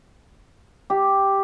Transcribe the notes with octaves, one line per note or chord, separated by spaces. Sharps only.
G4